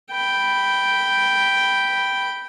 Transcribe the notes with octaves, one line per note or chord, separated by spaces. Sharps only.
G5 B5